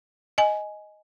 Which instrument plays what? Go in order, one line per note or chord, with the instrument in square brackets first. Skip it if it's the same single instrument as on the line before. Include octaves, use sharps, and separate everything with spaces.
[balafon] D#5 G#5